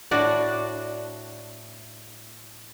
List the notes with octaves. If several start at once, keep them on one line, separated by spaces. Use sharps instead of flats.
A2 D4 F#4 D5